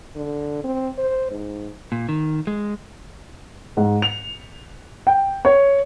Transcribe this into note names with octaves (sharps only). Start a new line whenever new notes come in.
D3
C4
C5
G#2
A#2
D#3
G#3
G#2
F7
G5
C#5